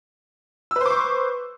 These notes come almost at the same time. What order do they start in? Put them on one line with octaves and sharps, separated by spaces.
E6 B4 C5 D6 C#6